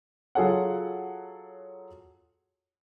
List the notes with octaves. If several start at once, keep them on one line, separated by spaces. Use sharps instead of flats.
F#3 F4 G#4 A4 C#5 F#5